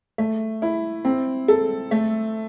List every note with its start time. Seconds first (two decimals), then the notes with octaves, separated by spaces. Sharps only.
0.18 A3
0.62 E4
1.05 C4
1.48 A4
1.91 A3